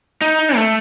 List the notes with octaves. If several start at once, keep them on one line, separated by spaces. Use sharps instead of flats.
D#4
A3